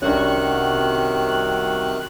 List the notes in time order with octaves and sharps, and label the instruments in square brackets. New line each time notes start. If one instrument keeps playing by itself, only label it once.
[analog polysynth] C2 F#4 C#6 [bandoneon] C3 D#3 F#6 [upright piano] C#4 D4